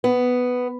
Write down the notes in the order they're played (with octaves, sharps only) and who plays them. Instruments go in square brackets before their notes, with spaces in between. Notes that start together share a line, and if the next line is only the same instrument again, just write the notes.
[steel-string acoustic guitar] B3